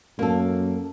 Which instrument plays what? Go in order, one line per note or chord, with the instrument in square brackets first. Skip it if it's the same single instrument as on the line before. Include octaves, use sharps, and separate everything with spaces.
[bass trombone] F#2 [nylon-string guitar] A#3 A4